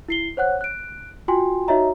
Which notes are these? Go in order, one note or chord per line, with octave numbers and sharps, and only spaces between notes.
E4 C7 G7
C5 C#5 F#5 F#6
F#6 D7
F4 F#4 G5 G#5 C6
D#4 F#4 C#5 D#5 E5 A#5